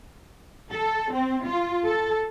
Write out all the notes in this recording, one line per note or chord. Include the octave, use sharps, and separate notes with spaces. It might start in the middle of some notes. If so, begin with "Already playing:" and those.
A4
C4
F4
A4